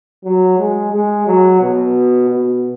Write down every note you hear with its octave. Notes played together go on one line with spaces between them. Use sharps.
F#3
G#3
G#3
F#3
B2
B2